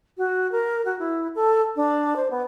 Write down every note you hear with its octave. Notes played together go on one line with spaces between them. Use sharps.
F#4
A#4
F#4
E4
A4
D4
C5
B3